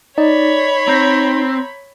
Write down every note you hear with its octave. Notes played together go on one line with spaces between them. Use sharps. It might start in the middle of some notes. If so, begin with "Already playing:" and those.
D#4 C#5 D5 B5
C4 A#5 G6 A#6